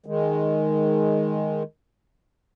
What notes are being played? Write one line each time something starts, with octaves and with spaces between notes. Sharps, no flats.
D#3 G#3